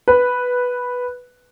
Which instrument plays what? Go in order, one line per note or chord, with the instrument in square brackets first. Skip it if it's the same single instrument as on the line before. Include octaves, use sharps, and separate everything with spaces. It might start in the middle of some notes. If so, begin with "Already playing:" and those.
[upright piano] B4